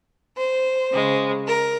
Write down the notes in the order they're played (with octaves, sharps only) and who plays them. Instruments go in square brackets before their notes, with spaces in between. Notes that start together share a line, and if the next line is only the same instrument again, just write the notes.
[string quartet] C5
C#3 G#3
A#4